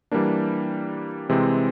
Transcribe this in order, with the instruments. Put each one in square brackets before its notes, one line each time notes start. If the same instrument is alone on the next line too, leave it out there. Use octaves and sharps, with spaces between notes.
[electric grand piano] E3 G3 A#3 D4
C3 E3 G#3 C4